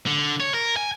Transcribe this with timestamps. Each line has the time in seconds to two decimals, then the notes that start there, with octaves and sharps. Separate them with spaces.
0.07 D3
0.40 C#5
0.54 A#4
0.77 G#5